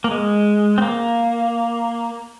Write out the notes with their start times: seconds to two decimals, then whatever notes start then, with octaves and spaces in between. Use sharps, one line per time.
0.04 A#3
0.11 G#3
0.78 C4
0.82 A#3